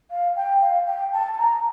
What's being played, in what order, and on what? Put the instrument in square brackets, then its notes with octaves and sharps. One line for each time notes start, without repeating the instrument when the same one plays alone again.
[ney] F5
G5
F5
G5
A5
A5
A#5